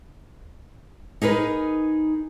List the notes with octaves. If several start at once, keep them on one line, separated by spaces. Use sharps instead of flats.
D#4 G#4 A#4 B4